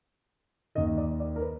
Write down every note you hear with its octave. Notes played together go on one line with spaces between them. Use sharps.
D#2 D#3 D#5
D5
D5
A#4
B4